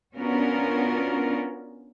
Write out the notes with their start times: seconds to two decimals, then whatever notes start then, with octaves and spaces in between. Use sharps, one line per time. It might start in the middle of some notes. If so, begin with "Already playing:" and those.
0.15 B3 C#4 D4 F4 F#4 A#4